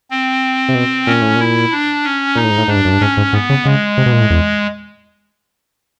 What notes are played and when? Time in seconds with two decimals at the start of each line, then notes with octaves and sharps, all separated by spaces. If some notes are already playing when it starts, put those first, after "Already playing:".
0.11 C4
0.69 C3
0.75 B2
1.06 A#2 C#4
1.21 A2
1.35 A#2 E4
1.72 D4
2.04 C#4
2.35 A#2 D#4
2.44 A2
2.51 G#2
2.58 A2
2.68 G#2 D4
2.76 G2
2.85 F#2
2.93 G2
3.00 G#2 C#4
3.17 G#2
3.33 G#2 B3
3.49 C#3
3.65 C#3 G#3
3.97 C3
4.06 B2
4.13 A#2
4.21 A2
4.30 E2